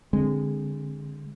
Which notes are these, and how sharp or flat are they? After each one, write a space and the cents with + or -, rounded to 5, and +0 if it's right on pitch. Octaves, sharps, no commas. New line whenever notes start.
D3 +0 G#3 -25 C4 +0